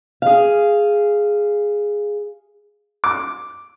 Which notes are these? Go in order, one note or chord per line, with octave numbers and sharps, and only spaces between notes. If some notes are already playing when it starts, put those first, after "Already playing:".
G#4 F5
D6